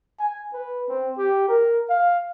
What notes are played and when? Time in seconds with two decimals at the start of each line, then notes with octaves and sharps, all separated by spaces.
0.20 G#5
0.54 B4
0.89 C4
1.18 G4
1.48 A#4
1.90 F5